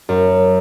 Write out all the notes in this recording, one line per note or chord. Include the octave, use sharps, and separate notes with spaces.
F#2